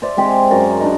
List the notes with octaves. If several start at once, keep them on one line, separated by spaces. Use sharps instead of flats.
C5 D5 E5
G#3 C4 G4 G#4
F#2 A#4 D5 C#6
D4 D#4